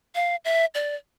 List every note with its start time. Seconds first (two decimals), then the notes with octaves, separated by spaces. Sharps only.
0.15 F5
0.45 E5
0.75 D5